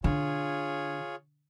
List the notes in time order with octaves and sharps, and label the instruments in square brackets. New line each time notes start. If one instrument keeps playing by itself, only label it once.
[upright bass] D3 [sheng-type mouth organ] F4 G#4 C#5